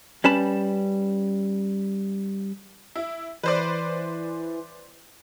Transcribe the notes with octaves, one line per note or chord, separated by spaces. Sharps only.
G3 C#4 B4 A5 B5
E4
E3 B4 C5 D5